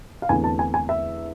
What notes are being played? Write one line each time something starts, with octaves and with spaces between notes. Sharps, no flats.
F5
E2 D3 A3 C4 G#5
A5
G#5
G#5
E5